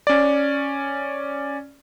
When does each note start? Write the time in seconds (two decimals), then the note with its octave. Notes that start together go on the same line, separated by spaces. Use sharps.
0.07 C#4 D5